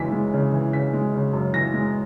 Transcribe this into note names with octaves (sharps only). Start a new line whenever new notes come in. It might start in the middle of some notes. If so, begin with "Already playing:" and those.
Already playing: F#2 C#3 E3 G#3 B6
G#3
C#3
E3
C#3 B6
G#3
C#3
F#2
E3 A#6
G#3